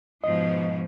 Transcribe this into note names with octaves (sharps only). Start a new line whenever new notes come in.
G#2 B2 F3 D#5